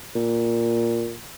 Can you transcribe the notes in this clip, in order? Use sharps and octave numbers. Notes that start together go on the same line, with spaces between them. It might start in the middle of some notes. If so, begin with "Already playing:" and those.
A#2